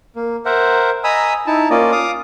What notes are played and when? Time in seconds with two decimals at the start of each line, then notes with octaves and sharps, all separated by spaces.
0.16 A#3
0.45 A#4 C5 E5 F#5
1.04 D#5 G#5 A#5 B5 D#6 E6
1.47 D#4 E4 A5
1.70 A#3 C#4 F4 D5 D#5
1.92 F5 D6 D#6